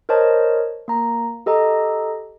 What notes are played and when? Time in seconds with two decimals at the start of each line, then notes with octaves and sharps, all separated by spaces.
0.09 A#4 C5 C#5 D#5 A5
0.88 A#3 A#5
1.46 G4 A4 D#5 A#5